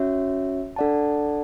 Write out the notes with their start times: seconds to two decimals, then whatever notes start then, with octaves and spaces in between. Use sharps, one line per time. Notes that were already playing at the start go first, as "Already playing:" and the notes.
Already playing: C#4 F#4 C#5 E5
0.76 D4 A4 D5 F#5 A5